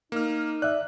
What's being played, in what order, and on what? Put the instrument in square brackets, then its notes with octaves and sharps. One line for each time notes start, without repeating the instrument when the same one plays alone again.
[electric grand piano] A#3 F6 [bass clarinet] D#4
[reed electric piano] D5 E5 [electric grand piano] F#6